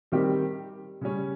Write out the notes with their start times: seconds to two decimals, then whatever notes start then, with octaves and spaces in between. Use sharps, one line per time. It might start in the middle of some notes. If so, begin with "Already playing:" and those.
0.12 D#3 G3 C4 G4
1.01 C#3 G3 C#4